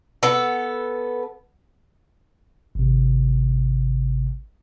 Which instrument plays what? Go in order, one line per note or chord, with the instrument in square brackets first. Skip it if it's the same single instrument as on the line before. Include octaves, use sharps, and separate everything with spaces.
[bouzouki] B3 A4
[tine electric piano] G#1 C3